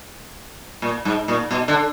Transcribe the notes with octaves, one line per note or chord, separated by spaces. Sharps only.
A#2
G#2
A#2
B2
D3